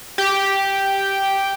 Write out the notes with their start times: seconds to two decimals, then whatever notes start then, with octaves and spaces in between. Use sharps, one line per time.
0.18 G4